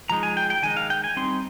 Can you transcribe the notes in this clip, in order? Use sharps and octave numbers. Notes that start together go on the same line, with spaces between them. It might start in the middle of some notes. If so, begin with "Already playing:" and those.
F3 G#3 D#4 A#5
G#5
G5
G5
D#3 G#3 D#4 G#5
F5
G5
G#5
G3 C4 D#4 C6